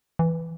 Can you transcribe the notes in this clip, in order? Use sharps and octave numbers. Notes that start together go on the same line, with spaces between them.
E3